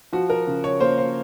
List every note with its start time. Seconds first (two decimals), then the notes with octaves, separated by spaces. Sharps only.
0.13 F3 F#4
0.30 A#4
0.47 C#3
0.64 C#5
0.80 A#3 C5
0.98 C5